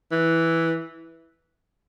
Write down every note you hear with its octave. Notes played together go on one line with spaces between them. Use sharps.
E3